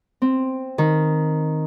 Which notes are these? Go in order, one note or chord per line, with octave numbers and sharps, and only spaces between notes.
C4
D#3